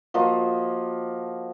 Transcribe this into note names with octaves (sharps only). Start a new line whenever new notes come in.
F3 A#3 F#4 D#5